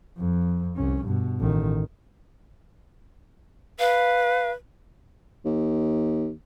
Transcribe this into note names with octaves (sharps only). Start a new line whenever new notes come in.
F2
C2 C#4
G2 B2
A1 D#3
B4 F5
D#2